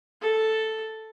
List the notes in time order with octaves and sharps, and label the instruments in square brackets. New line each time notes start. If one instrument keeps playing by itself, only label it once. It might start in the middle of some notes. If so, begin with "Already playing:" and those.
[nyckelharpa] A4